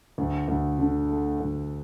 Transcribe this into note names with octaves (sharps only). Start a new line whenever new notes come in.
D2
D2
D3
A3
D2